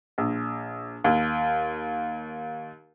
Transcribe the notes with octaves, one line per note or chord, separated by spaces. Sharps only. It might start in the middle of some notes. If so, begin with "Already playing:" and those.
A#1
D#2